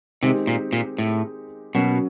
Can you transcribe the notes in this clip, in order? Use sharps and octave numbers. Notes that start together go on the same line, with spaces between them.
C3 D#3 G#3 C4 D#4 G4
A#2
A#2
A2
B2 F#3 A#3 C#4 F#4